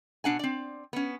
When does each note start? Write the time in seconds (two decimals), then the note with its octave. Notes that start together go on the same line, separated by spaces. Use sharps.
0.24 B2 D4 F#5 G#5
0.39 C4 D5
0.93 B3 C#4